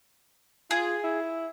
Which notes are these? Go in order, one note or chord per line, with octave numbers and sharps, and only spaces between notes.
F4 G#4
E4